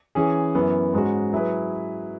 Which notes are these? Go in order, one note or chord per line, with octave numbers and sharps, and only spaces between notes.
E3 C#4 G#4
F#2 E3 B3
G#2 G#3 C#4 F#4
F#3 E4 G#4 B4